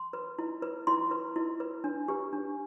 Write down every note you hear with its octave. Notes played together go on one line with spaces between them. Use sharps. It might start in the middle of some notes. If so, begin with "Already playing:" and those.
Already playing: C6
B4
E4
B4
E4 C6
B4
E4
B4
D4
G4 B4
D4